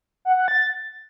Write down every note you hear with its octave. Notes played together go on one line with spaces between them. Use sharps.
F#5
F#5
A6